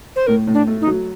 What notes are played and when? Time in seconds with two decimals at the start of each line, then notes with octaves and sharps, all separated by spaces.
0.16 C5
0.27 A2 A#4
0.47 A2
0.54 D4
0.67 A3
0.81 D#4
0.87 F#3